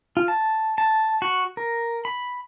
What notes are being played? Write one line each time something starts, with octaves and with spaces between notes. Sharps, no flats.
F4
A5
A5
F#4
A#4
B5